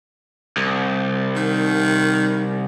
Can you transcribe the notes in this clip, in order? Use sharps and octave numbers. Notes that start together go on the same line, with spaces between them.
C2
D#3